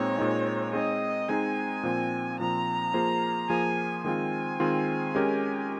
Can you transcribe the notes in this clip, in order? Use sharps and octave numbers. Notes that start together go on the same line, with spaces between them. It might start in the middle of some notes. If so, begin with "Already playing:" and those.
Already playing: A#2 G#3 C4 D#4 C#5
A#2 G#3 C4 D#4
G#3 C4 D#4 G#4 D#5
G#3 C4 D#4 G#4 G#5
A#2 F3 C4
A#2 F3 C4 A#5
F3 A#3 F4 G#4 C5
F3 A#3 F4 G#4 C5 G#5
D#3 G#3 C4 F4 G#5
D#3 G#3 C4 F4
G#3 C#4 G4 A#4